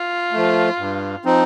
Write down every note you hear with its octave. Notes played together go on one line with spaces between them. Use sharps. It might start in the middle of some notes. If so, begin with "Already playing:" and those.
Already playing: F4
F3 A3
G2
F3 C4 D#4